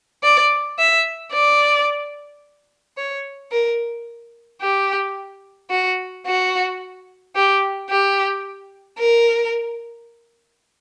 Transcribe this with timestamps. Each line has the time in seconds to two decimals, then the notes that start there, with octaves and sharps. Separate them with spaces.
0.23 D5
0.79 E5
1.33 D5
2.97 C#5
3.52 A#4
4.62 G4
5.71 F#4
6.26 F#4
7.36 G4
7.90 G4
8.99 A#4